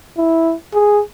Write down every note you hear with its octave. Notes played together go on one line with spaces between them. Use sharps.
E4
G#4